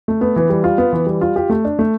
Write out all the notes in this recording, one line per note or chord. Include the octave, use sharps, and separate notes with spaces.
A3
B3
E3
G3
F4
B3
E3
G3
F4
G4
A3
D4
A3